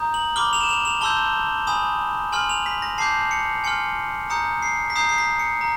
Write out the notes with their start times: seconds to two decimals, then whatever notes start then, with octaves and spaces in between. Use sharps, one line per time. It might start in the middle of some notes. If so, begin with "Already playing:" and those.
Already playing: A#5 D#6 G6
0.14 F#7
0.36 B5 D6 F6 G7
0.53 F7
0.61 E7
0.69 F7
0.85 F7
1.01 A5 C6 E6 G6 G7
1.67 G#5 B5 D#6
2.32 G#5 C6 F6 F#7
2.49 F7
2.66 B6
2.82 A#6
2.98 A5 D6 G6 C7
3.31 C#7
3.64 G#5 C6 F6 C#7
4.30 A#5 D#6 G6 C#7
4.62 C7
4.90 B6
4.96 A#5 D#6 G6 C7
5.09 C7
5.18 B6
5.39 C#7
5.61 A#5